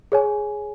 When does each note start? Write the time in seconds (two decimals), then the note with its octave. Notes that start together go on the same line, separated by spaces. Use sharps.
0.12 G#4 C#5 G#5